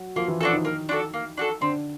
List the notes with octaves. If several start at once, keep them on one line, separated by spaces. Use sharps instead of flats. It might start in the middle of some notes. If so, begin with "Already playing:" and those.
Already playing: F#3 F#4
F3 A#3 F4
E3 E4
F3 D4 F4 F#4 A4
D#3 D#4
A#3
D4 F#4 A4
A#3
D4 F#4 A4
D3 C4 D4